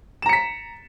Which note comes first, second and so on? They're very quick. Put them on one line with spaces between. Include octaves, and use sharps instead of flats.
E7 A#5 C#7 B6